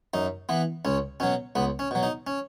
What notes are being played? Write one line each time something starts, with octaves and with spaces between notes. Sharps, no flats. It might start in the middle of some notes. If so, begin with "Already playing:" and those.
F#2 D#4
E3 B3
C#2 C#4
B2 F#3 C#4
C#2 B3
C#4
B2 F#3
D#4
C#4